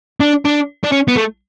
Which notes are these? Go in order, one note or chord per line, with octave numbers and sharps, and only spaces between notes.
D4
D4
D4
C#4
B3
A3